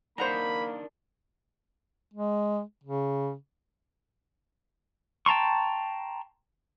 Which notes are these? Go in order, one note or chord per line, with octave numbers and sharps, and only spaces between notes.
A#3 D4 D#4 A#4 C5 F#5 A#5 B5
G#3
C#3
G5 A5 A#5 C6 C#6